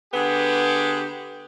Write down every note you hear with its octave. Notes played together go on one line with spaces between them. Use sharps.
D3 B3 G4 G#4